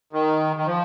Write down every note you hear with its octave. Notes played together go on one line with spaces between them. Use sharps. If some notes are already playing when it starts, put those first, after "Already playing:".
D#3
D#3
F3